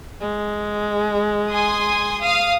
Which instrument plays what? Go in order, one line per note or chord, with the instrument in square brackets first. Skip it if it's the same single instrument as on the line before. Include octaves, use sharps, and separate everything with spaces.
[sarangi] G#3
[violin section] G#5 C6 D#6
F5 D#6